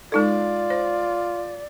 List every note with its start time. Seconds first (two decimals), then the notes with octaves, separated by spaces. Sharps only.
0.12 G#3 D#4 F4 A4 D5
0.70 C5